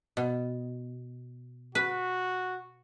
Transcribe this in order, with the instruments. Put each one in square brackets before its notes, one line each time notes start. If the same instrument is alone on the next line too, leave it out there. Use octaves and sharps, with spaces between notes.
[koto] B2
[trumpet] F#4 [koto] B4